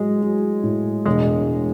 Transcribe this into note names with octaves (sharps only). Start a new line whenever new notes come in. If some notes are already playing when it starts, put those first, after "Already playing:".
Already playing: A2 F#3 G#3
F#3
A2
E1 G#3